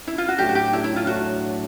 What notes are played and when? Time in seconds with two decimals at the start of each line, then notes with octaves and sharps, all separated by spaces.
0.07 E4
0.18 F4
0.29 F#4
0.38 A2 F#3 A3 D4 G4
0.49 F#4
0.55 G4
0.73 A2 F#3 A3 D4 E4
0.84 E4
0.96 F4
1.06 A2 F#3 A3 D4 F#4